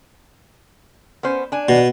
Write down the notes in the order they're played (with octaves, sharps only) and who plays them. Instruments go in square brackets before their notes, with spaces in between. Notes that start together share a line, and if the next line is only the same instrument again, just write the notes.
[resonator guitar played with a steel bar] B3 C#4 C5
D4 G#5
[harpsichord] B2